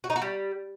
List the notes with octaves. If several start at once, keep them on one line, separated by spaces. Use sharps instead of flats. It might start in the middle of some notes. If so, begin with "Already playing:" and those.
F#4
D#4
F#4
G3